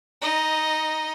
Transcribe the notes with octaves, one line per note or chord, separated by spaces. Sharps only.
D#4 D#5